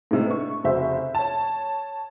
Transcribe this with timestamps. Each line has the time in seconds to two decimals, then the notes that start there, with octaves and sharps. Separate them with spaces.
0.11 A2 C3 G#3
0.26 B3 D4 C#6
0.64 F1 C#3 F#4 C5 E5
1.15 C#5 A5